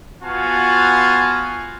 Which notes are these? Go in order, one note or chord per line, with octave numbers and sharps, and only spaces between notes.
B3 F4 F#4 F5 G#5 A5